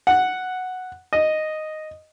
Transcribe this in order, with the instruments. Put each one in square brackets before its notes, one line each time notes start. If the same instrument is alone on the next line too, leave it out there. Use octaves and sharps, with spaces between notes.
[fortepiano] F#5
D#5